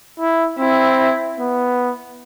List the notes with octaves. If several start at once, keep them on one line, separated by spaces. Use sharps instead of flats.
E4
C4 E4
B3